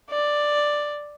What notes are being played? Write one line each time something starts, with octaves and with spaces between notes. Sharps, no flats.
D5